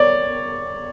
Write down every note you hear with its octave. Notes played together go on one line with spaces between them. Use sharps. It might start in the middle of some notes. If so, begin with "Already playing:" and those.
Already playing: C#5 D5